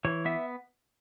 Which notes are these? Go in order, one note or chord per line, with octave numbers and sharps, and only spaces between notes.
E3 C#5
B3 E5